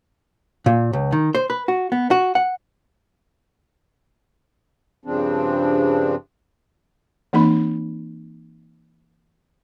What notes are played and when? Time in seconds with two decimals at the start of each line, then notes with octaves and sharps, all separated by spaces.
0.66 A#2
0.93 C#2
1.12 D#3
1.35 C5
1.50 B4
1.68 F#4
1.92 B3
2.11 F#4
2.35 F#5
5.05 G2 C#3 F3 C4 D4
7.33 E3 A#3 C4 D#4 B5